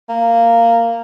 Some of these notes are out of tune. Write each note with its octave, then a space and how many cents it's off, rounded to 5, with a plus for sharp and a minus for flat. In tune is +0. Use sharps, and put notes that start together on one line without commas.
A#3 -10